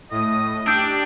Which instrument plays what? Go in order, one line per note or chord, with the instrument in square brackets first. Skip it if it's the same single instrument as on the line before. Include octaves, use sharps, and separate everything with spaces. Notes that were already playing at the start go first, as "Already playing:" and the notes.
[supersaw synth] A2 D#6 [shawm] D#5
[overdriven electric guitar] D4 [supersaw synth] G4 [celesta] E6 G6 D7